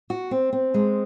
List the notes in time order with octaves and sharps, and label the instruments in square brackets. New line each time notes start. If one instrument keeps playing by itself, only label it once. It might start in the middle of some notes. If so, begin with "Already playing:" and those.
[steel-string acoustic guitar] F#4
C4
C4
G#3